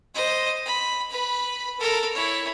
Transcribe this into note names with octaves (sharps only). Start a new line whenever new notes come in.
C5 D#5
B5
B4 B5
A4 A#4
E4 C#5